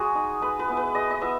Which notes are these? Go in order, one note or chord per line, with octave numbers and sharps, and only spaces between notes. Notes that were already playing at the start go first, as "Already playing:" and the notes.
Already playing: G#3 F#4 G#4
D#4
G#3 B4
B4
B3 E4
B4
G#3 D#5
D#5
B3 E4 E5